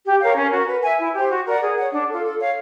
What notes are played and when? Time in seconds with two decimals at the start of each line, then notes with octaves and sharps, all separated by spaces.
0.05 G4
0.20 A#4 C#5 F5
0.36 C#4
0.52 F#4 A#4
0.67 B4
0.83 E5 G#5
0.99 E4
1.14 G4 C5
1.30 F#4
1.46 A#4 D5 F#5
1.62 G#4
1.77 C#5 F#5
1.93 D4
2.09 F4 A4
2.24 A4
2.40 C#5 F5